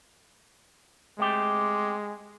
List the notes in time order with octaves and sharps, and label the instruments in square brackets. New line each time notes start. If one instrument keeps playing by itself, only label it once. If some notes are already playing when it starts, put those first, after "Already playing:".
[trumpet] G#3 [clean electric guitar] A3 C4 G4